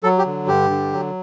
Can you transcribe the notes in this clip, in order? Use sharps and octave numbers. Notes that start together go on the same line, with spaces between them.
F#3 A4
G4
D3
G2 G4
D3
F#3